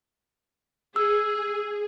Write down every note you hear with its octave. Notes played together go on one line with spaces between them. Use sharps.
G#4 E6